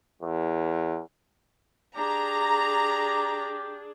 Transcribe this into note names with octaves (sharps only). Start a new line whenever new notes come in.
E2
D4 G4 G#4 A#5